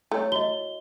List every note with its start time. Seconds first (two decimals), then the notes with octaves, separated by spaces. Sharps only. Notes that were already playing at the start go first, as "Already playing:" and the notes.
0.11 A3 E4 C#5
0.32 F#4 D#5 G7